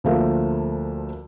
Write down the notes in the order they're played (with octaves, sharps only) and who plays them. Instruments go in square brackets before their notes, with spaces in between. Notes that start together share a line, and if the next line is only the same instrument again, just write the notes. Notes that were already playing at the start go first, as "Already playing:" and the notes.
[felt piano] D2 F3 A3 A#3